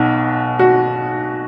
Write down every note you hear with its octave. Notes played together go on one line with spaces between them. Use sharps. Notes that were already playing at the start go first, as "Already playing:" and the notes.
Already playing: B1 B2
F#4